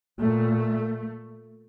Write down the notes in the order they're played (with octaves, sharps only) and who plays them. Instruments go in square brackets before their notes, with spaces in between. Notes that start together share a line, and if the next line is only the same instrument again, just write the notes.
[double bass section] A#2 A3